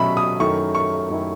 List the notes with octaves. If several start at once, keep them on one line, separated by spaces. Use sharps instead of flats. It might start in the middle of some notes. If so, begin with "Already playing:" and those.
Already playing: B2 F#3 C#4 E5 B5
D#6
F#2 D#3 A3 E4 C#6
C#6
F#2 D#3 A3 E4